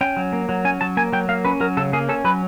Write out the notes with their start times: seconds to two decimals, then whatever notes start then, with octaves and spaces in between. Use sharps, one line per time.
0.01 C#4 G5
0.17 F#3
0.33 A#3
0.49 F#3
0.65 C#4 G#5
0.81 F#3 A5
0.97 A#3 G#5
1.13 F#3 G5
1.29 A#3 F5
1.45 C#4 B4
1.60 F#3 A#4
1.77 C#3 A4
1.93 A#3 G#4
2.09 C#4 A4
2.24 F#3 B4